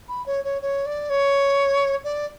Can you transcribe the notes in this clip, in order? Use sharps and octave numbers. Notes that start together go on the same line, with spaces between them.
B5
C#5
C#5
C#5
D5
C#5
D5